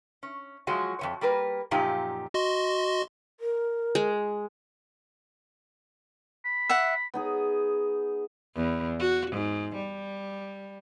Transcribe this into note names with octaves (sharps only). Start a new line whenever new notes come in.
C#4
F3 F#3 G#3 F#4
F2 D#3 C#5
G3 A#3 A#4 B4
F#2 A#2 F3 D#4 G4
F#4 D#5 C6
A#4
G#3
B5
E5 F#5
B3 D#4 G#4
E2
F#4
G#2
G3